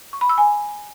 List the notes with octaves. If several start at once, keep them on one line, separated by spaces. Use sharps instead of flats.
C#6
B5
E6
G#5